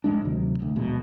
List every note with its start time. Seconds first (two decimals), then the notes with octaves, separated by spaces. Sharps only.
0.04 A1 C3 G#3 D4
0.25 D2 C3 D#3 F#3
0.60 D1 D2
0.76 D1 A#1 B2 G#3